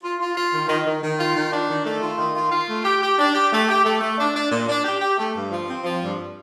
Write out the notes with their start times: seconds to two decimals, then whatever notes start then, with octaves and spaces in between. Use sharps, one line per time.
0.03 F4
0.20 F4
0.35 F4
0.52 D#3
0.68 D#3
0.86 D#3
1.02 D#3
1.19 F4
1.35 D#3
1.52 D4
1.68 D#3
1.85 A3
2.02 F4
2.19 D#3
2.35 F4
2.52 F4
2.68 A3
2.84 G4
3.01 G4
3.18 D4
3.35 G4
3.52 A3
3.69 G4
3.84 A3
4.01 A3
4.18 D4
4.35 D4
4.52 A#2
4.68 D4
4.85 G4
5.01 G4
5.17 A3
5.34 G2
5.51 F3
5.67 C4
5.84 F3
6.01 G2